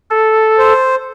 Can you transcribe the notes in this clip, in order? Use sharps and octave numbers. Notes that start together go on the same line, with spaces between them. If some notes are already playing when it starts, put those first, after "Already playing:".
A4
C5